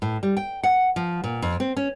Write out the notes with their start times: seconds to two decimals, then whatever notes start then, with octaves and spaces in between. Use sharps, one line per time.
0.02 A2
0.23 G3
0.37 G5
0.63 F#5
0.96 F3
1.24 A#2
1.42 F2
1.60 C4
1.77 C#4